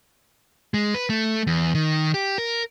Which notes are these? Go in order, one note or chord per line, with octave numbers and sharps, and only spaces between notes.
G#3
B4
A3
E2
D#3
G4
A#4